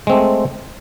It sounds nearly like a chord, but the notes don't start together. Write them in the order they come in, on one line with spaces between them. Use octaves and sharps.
G#3 C4 A3